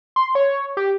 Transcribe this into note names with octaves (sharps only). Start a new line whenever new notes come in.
C6
C#5
G4